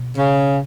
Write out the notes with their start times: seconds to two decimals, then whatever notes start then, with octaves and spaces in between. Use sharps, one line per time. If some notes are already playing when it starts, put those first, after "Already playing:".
Already playing: B2
0.17 C#3